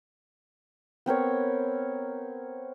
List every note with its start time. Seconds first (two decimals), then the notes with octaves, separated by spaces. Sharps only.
1.06 B3 C4 A#4 C#5